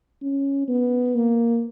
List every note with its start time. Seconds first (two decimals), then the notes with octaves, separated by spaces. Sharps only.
0.22 C#4
0.68 B3
1.15 A#3